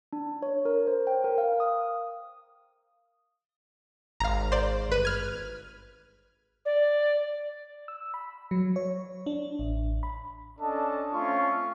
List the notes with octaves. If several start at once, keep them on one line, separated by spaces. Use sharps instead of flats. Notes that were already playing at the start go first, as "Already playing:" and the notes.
D4
C#5
A#4
C5
G5
A#4
F5
D#6
G#1 F5 A#5
C5 D5
G1 B4 D#7
F6 G#6
D5
E6
B5
F#3
C#5
D4
A1
B5
C#4 D4 A4 D#5 A5
A3 C4 C#4 F4 C6 C#6